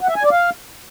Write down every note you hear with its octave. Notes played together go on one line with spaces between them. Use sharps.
F#5
E5
G#5
D5
F5